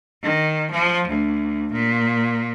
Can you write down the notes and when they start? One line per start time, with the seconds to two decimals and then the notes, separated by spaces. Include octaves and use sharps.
0.23 D#3
0.71 F3
1.08 D2
1.72 A#2